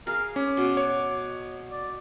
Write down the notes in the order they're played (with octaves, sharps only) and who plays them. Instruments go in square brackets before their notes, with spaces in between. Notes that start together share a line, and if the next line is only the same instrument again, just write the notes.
[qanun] G#4 F5 [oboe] A#4
[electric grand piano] C#4 [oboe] D6
[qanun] B2
[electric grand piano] C#5
[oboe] D5